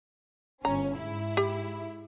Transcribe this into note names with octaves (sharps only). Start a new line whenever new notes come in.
G1 C#4 A#5
G#2 E4
G4